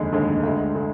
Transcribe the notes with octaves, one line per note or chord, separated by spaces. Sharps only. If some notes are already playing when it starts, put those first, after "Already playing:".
Already playing: F1 D#2 D3 G#3
F1 D#2 D3 G#3
D2 D3 G#3
D3 G#3